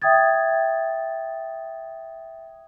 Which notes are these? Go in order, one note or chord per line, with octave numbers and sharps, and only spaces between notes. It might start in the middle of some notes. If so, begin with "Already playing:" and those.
E5 G5 D#6 G#6 A6